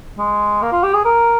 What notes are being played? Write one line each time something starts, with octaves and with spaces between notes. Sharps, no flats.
G#3
A#3
F4
G4
G#4
A#4